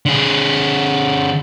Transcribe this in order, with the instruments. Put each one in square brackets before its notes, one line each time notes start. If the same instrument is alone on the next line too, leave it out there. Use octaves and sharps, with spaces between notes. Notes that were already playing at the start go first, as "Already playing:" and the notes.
[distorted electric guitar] D3 G#4